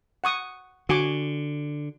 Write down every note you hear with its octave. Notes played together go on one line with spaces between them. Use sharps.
F#5 C#6 D#6
D3 F#4 G#5 D6